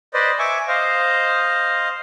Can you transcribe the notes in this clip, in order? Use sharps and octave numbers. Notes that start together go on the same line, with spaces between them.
B4 C5 D5 D#5
E5 G#5 C#6 D6
C5 D#5 F5